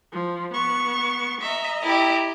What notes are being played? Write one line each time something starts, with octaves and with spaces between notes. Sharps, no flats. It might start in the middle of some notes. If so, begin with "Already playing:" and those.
F3
B3 C#6
D#5 E5 A#5
E4 G4